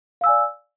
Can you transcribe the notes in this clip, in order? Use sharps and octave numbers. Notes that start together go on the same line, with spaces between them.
D5 F5 G#5 E6